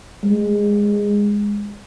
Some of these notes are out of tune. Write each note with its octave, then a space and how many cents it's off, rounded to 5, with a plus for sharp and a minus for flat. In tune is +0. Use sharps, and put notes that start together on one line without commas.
G#3 -15